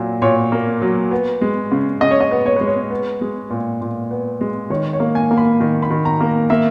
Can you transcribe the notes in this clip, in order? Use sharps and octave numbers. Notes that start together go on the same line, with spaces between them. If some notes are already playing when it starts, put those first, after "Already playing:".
Already playing: A#2 F#3
A#2 C#5
A#3
F#3
B3
G#3
C#3
C#3 D#5
C#5
D#5
B3
C#5
G#3 B4
C#5
B3
G#3
A#2
A#2
B3
G#3
D#3 C#5
C#5
A#3
G#5
A#3
B5
D#3
B5
D#3
A#5
A#3
A#3 E5